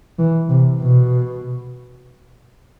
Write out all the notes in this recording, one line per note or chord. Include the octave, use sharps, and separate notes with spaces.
E3
C3
B2